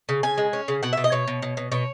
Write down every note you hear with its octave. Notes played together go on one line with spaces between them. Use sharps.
C#3
C#3 G#5
G#3
C#4
C#3
B2 F#5
E5
B2
D#5
B2 C#5
B2
B2
B2
B2 C#5